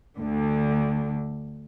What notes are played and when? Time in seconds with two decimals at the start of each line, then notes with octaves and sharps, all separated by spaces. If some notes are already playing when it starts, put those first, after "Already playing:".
0.19 D2 D3